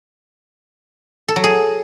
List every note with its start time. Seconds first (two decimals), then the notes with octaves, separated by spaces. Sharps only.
1.28 A4
1.36 F#3
1.44 G#4